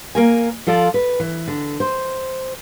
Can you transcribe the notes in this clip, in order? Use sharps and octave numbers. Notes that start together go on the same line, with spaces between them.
A#3 A#4 G#5
F3 F4 A4 D5
B4
E3
D3
C5